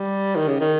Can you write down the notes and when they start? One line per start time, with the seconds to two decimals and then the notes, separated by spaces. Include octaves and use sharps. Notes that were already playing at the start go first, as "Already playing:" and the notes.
Already playing: G3
0.36 D#3
0.48 C#3
0.60 D#3